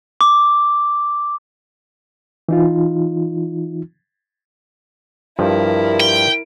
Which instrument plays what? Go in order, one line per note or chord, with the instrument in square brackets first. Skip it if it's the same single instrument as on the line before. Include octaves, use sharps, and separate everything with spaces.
[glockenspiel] D6
[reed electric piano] E3 D#4 F4
[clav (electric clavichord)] G2 F3 [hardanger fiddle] E4 A#4
[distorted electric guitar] G5